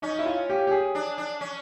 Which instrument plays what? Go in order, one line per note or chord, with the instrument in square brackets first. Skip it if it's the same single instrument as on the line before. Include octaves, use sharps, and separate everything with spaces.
[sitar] C#4 [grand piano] D#4
[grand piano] E4
F4
G4
G4
G#4
[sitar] D4
D4
C#4